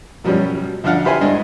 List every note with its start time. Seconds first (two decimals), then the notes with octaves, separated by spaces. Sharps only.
0.24 F#2 B2 F3 G3 C#4
0.84 D2 F3 D4 F5 F#5
1.04 E4 G4 B4 C5 G#5 B5
1.21 G2 G#3 D4